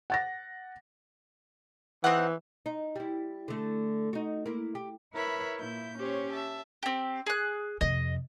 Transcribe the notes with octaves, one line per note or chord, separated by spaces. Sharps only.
F#5 A6 A#6
E3 C4 D#4 F#5
D#4
G3 E4
D3 A3
D#4 F#4
A#3 E4
G4
E4 A#4 B4 C#5 E5 B5
A#2 E4 G6
C#4 G4 C5 C#5
E5 A5
C4 G4
G#4 F#6
F2 C3 D#5